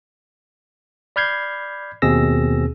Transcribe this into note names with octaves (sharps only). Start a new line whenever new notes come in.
D5 B5 F6 G6 G#6 C7
D#2 B2 C4 G#4 E6 A#6